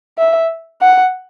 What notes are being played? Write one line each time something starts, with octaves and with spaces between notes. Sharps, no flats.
E5
F#5